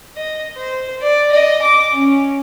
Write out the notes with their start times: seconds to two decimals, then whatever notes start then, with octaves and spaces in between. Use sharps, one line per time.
0.16 D#5
0.56 C5
1.02 D5
1.32 D#5
1.62 D6
1.94 C#4